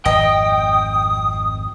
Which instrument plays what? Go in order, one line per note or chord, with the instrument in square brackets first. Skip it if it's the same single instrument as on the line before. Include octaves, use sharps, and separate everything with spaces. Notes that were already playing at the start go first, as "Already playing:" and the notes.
[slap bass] G#1 F2 [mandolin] D#5 [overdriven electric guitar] G5 [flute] D#6